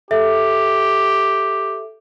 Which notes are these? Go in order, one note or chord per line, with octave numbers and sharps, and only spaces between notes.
G4 A4 E5